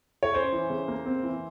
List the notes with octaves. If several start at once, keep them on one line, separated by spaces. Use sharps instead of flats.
C#5
C#4 C5
E3
C#3
A#3
C4
E3